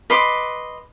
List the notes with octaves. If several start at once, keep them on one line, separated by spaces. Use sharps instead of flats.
B4 D#5 C6 D6